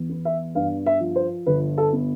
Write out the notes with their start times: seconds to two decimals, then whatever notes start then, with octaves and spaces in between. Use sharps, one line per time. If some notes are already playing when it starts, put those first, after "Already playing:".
Already playing: E2
0.09 B3
0.25 E5
0.55 G2 F5
0.86 E5
1.00 F3
1.16 C5
1.46 G1 B4
1.78 A4
1.93 B3